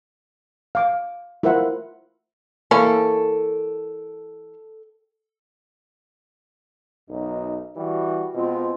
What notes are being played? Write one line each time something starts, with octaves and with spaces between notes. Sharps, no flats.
F5 D6
E4 F4 A#4 C5 E5 F#5
E3 A#3 C#4 A4 G5
B1 F#2 D#4
E3 G3 F#4
B2 G#3 C4 F4